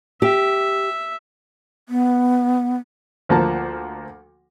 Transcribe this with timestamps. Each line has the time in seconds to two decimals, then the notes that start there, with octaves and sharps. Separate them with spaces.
0.22 G4 E5
1.89 B3
3.29 D2 F3 A#3 A5 A#5